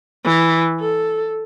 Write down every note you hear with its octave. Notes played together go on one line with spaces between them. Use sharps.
E3
A4